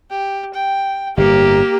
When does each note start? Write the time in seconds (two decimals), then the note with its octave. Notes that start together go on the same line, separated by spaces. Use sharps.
0.10 G4
0.54 G5
1.17 G1 A2 A#3 G4